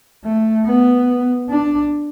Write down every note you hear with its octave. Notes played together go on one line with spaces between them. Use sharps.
A3
B3
D4